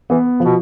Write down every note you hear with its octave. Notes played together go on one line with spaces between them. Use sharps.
E3 B3
B2 F3